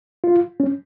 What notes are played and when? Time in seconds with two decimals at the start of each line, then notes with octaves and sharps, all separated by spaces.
0.24 F4
0.60 C#4